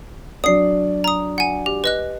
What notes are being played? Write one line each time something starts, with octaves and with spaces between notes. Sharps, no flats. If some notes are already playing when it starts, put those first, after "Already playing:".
F#3 D4 D5 D#6 C7
A#5 D#6
F#5 G#5
G4
B4 D#5 F#6